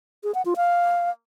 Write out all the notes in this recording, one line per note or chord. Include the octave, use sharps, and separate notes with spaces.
G#4
F#5
F4
F5